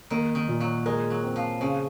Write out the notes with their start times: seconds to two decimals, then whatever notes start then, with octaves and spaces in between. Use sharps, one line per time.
0.10 D#3 A#3
0.35 D#3
0.48 A#2
0.60 F#3
0.86 G#3 A#4
1.10 F#3
1.23 C4
1.36 F3
1.60 C#3 C5